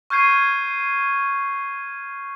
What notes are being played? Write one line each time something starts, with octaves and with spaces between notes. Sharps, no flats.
C#6 F6 G6 G#6 C7 D#7